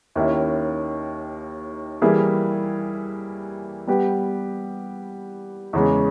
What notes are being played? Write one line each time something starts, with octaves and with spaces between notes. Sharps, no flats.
D#2 D#3 A#3 C#4 E4
E3 G3 A#3 E4 G#4
G3 B3 G4
E2 C#3 G#3